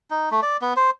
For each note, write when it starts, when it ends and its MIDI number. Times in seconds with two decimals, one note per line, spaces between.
0.10 0.29 63
0.31 0.41 57
0.43 0.57 74
0.62 0.73 59
0.76 0.90 72